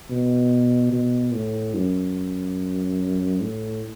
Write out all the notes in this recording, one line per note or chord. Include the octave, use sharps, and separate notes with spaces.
B2
B2
A2
F#2
A2